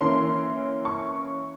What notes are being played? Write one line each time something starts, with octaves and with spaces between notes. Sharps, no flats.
E3 A#3 C#4 C6
C#6